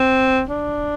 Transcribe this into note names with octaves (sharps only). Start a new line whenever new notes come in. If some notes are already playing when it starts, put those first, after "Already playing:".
Already playing: C4
D4